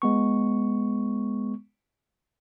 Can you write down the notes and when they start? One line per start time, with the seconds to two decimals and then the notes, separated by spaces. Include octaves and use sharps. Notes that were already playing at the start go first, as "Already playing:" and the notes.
0.02 G#3 B3 C#6